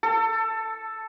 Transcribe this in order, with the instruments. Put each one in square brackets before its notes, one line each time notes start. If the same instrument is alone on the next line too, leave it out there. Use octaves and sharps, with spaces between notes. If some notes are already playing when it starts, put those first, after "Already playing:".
[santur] A4